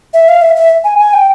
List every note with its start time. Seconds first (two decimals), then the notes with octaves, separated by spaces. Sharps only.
0.14 E5
0.28 F5
0.42 E5
0.56 E5
0.84 G#5
0.98 G#5
1.13 G5